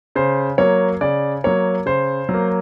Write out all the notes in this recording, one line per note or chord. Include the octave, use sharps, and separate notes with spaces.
C#3 C5
F#3 A#3 C#5
C#3 D5
F#3 A#3 C#5
C#3 C5
F#3
A#3